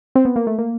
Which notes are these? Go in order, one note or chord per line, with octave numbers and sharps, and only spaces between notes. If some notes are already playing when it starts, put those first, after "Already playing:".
C4
B3
A#3
A3
A#3